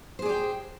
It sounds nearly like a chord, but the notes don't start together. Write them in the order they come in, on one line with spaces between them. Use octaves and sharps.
C5 G#4 D5 G4 G5